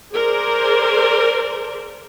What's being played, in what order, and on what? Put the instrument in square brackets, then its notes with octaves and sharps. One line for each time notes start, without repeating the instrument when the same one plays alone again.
[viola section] G#4 A#4 C5 D5